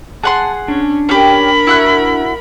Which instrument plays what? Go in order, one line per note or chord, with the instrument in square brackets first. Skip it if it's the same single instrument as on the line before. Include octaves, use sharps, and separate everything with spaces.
[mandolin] G#4 F#5 C6 [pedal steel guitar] A5 F#6
[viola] C#4 [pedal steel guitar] D4
[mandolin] C#4 G4 [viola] A#4 B5
[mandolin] E4 F#4 F#6